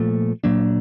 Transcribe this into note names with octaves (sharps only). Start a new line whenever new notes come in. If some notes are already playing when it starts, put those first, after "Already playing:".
Already playing: A#2 F3 A3
A#2 F#3 A#3 D4